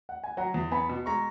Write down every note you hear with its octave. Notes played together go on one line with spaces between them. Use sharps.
F#5
G#5
F#3 F#5 A#5
E2
B3 G#5 B5
B2
G#3 A#5 C#6